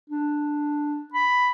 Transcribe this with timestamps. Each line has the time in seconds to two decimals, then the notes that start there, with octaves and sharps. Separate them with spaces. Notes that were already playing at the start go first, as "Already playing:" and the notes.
0.10 D4
1.13 B5